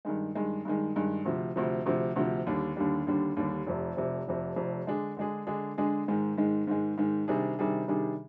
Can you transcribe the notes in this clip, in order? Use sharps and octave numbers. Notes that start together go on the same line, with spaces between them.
G2 D#3 G#3
G2 D#3 G#3
G2 D#3 G#3
G2 D#3 G#3
D2 C3 F3
D2 C3 F3
D2 C3 F3
D2 C3 F3
D#2 D3 G3 D4
D#2 D3 G3 D4
D#2 D3 G3 D4
D#2 D3 G3 D4
F1 F2 C3
F1 F2 C3
F1 F2 C3
F1 F2 C3
D3 G#3 D4 G#4
D3 G#3 D4 G#4
D3 G#3 D4 G#4
D3 G#3 D4 G#4
G#2 D#3 G#3
G#2 D#3 G#3
G#2 D#3 G#3
G#2 D#3 G#3
C3 D#3 G3 D4 G#4
C3 D#3 G3 D4 G#4
C3 D#3 G3 D4 G#4